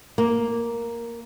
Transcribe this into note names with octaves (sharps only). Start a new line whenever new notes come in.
A#3